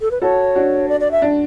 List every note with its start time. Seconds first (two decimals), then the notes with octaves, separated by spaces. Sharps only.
0.01 A4
0.11 B4
0.22 F#4 A4 C#5
0.55 D4 F#4
0.89 D5
1.00 D5
1.11 E5
1.22 D4